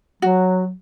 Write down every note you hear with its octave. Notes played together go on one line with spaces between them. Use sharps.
F#3 F#4